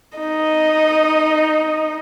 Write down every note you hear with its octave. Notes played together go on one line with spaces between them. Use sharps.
D#4 D#5